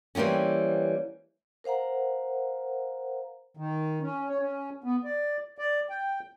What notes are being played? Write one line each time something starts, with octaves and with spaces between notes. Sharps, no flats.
E3 G3 A#3 C4 C#4
A#4 C5 F5 F#5 A#5
D#3
C#4
C#5
C#4
B3
D5
D5
G5